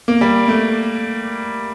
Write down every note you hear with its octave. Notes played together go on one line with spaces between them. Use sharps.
A#3
G3
A3